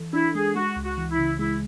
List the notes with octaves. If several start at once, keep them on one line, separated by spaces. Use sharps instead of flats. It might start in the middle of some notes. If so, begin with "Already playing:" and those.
Already playing: E3 A4
D4 E4
G#3 G#4
G#3 F#4
C#2
F#4
E3
E4
C#3
G#3 E4